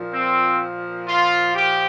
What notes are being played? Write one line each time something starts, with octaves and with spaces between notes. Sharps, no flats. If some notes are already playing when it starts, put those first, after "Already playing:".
Already playing: A#2 F3
C4
F4
G4